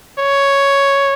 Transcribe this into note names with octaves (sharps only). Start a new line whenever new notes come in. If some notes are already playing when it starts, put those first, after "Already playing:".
C#5